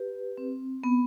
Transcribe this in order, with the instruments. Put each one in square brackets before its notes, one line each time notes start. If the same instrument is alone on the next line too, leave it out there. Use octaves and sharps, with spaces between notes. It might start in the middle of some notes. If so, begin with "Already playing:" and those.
Already playing: [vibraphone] G4 B4
C4
B3